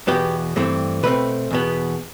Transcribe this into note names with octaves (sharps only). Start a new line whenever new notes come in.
E2 B2 B3 G4
G2 E3 A3 C4
B2 A3 C4 B4
E2 B2 B3